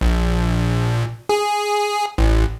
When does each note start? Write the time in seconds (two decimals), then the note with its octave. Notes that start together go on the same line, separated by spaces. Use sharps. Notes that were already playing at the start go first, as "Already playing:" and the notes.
0.01 A#1
1.29 G#4
2.18 A1